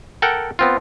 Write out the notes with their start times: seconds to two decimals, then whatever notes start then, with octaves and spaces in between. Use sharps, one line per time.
0.22 A4 A#4 F#5 G5
0.59 B3 C4 F4